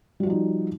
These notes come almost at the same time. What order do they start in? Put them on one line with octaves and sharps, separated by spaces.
G3 F#4 F3 D#4